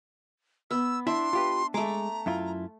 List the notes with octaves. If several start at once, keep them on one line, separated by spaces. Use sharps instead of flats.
B3 E6
D4 E4 E5 C6
F4 G4 B4
G#3 A3 A#5 D6
F#2 E4 F4